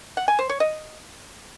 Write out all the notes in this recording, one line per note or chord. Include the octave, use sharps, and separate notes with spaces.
F#5
G#5
C5
C#5
D#5